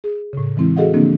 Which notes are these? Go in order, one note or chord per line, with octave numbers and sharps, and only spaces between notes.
G#4
A2 C#3
E3 G#3 C4 E4
F#4 G#4 A4 D#5 F5 F#5
D3 F3 A#3 C4 D4